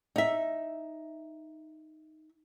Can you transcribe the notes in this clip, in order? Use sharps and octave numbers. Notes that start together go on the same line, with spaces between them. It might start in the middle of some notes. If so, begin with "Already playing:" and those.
D#4 E5